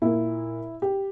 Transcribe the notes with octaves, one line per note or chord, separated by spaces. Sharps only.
A#2 A#3 E4
G4